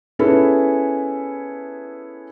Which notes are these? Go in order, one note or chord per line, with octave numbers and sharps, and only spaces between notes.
B3 C#4 E4 G#4 A4 B4